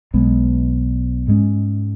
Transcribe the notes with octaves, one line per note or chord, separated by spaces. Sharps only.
B1 B2 G#3 B3
G#2 G#3 C#4